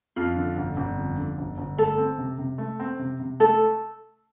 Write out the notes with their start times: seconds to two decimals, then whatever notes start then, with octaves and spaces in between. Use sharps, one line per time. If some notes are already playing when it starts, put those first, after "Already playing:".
0.16 F2 F4
0.36 D3
0.57 G1
0.77 G1
0.97 F2
1.17 D3
1.38 G1
1.58 G1
1.78 A3 A4
1.98 C4
2.18 C3
2.38 C3
2.58 A3
2.80 C4
2.99 C3
3.19 C3
3.40 A3 A4